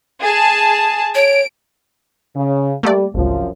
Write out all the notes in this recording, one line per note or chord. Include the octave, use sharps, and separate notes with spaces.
G#4 A5
C#5 D7
C#3
G3 A3 A#3 D5
G#1 C#2 F#2 C3 F3